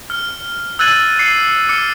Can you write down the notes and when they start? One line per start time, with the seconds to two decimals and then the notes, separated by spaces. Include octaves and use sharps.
0.10 F6
0.79 E6 F#6 G#6 A6 D#7 F#7
1.19 D6 C7 C#7
1.69 D6 F6 C#7